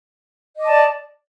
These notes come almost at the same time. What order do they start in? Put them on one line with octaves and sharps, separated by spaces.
D#5 D6 A5 D5